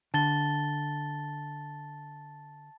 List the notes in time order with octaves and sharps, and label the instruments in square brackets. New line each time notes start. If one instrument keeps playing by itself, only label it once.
[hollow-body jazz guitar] D3 [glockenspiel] A5 A6 G7